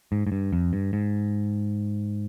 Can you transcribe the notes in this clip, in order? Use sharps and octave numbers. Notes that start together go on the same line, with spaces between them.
G#2
G#2
G2
F2
G2
G#2